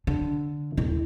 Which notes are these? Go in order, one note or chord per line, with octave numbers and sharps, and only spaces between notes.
D3
D#1 E4